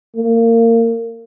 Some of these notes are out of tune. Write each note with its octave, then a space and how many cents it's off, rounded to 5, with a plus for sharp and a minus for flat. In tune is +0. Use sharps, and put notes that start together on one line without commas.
A#3 -25